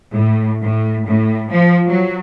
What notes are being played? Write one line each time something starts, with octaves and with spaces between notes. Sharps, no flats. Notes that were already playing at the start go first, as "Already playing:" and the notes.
A2
A2
A2
F3
F#3